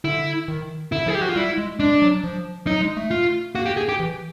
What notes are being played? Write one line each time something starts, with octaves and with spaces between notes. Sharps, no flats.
D3 E4
D#3
D3 E4
F3 G#4
G4
F#4
F4
G3 E4
G#3
G#3 D4
F#3
F3
F#3 D#4
G#3
A3
F4
A#3 F#4
G4
G#4
G4
E3